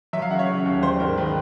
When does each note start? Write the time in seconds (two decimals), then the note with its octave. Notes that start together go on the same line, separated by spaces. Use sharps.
0.13 F#3 E5
0.22 F5
0.30 C#3 F#5
0.39 C#5
0.48 C#3
0.66 D#2
0.83 G3 C5
1.00 G#2 A#4
1.17 D#3 B4